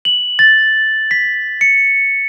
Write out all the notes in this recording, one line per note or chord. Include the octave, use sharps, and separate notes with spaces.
F#7
A6
B6
C#7